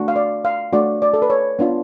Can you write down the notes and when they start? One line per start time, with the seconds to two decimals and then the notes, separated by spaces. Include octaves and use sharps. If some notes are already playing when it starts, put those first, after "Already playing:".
Already playing: A3 D4 F#4
0.08 F5
0.16 D5
0.45 F5
0.73 A3 D4 F#4 D5
1.02 D5
1.14 A4
1.22 B4
1.30 C#5
1.59 B3 D4 F4